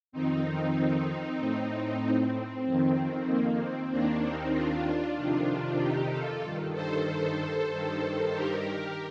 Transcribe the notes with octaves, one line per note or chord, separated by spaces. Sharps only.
F2 D#3 C4 D#4
A2
C4
F2 D#3
A#3
C4
D#2 D#3 A#3 D4
C4 D#4
D4 F4
F2 C3 D#3 D4 F4
D#4 G4
F4 A4
G2 D#3
A4 C5
A4 C5
G2 D#3
G4 A#4